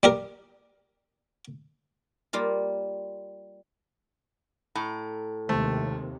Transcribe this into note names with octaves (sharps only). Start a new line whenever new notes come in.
G3 G4 A#4
G3 A#3 F4
A2 A#5
D#2 C3 D#3 G#3 A3 C5